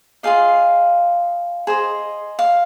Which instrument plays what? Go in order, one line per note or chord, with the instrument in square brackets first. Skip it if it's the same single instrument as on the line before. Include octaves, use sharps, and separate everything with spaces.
[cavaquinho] F4 G#4 D#5 F5
G#4 C5 D#5
F5